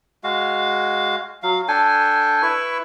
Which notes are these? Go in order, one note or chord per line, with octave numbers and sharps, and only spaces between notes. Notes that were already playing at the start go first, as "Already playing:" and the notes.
G#3 F#4 F5
F#3 F5
D4 A4 G5 G#5
E4 B4 C#6